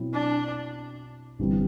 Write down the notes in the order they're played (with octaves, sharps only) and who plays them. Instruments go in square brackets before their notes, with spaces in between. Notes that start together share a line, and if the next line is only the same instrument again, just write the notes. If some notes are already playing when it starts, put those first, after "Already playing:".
Already playing: [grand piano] B2 F#3 C4 E4
[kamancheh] D4
[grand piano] G1 G2 E3 G3 C4